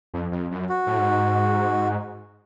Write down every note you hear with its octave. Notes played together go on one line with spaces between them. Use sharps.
F2
F2
F#2
F#4
A2
G#2